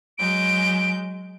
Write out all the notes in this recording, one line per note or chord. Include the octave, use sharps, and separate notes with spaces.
F#3 G#3 G6 D7